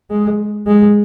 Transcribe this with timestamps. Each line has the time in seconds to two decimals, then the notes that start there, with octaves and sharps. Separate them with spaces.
0.11 G#3
0.67 G#3